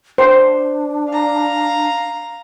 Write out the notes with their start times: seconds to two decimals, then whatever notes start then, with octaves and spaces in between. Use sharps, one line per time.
0.18 D4 C5
1.11 F5 A#5